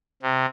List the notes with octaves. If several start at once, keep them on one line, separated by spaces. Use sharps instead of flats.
C3